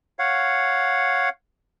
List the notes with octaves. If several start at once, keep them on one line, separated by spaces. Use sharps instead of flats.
C#5 F5 F#5